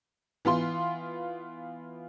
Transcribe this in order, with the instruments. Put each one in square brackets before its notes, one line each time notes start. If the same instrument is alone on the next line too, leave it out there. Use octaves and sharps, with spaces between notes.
[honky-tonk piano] E3 B3 F4 C6